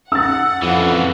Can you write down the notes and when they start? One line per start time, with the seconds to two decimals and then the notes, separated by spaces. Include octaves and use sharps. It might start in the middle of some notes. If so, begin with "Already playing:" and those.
0.12 F#5 E6 A6
0.62 F2 C#3 E3